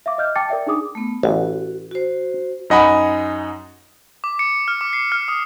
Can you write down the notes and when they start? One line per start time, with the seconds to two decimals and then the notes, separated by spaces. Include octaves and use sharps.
0.06 E5 F5 D6
0.18 D#5 F6 G6
0.35 G5 A5 D6 A6 C#7
0.49 A#4 D5 E5 G5
0.66 D4 D#4 G#4 D6 D#6
0.95 A3 B3
1.23 A1 F#4
1.91 F#4 C5
2.70 F#2 D#4 D#5 F#5 G#5 B5
4.24 D6
4.39 C#7
4.68 F6
4.81 D6
4.93 C7
5.12 F6
5.28 D#6